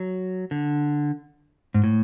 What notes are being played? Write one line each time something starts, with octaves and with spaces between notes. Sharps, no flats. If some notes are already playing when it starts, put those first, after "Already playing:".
Already playing: F#3
D3
G#2
A2